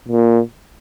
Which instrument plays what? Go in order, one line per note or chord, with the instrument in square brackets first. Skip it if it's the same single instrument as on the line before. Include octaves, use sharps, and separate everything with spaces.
[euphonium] A#2